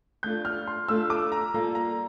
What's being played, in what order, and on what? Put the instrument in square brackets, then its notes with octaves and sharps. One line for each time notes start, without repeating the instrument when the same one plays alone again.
[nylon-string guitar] A3 D4 F4 A4 [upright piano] G6
[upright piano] F6
C6
[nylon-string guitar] A3 D4 F4 A4 [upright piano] E6
[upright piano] D6
A#5
[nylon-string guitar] G3 A#3 F4 A4 [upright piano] A#5
[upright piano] A#5